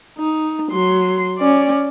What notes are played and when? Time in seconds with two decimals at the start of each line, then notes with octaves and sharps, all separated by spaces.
0.18 D#4
0.72 F#3 C6
1.38 C#4 D5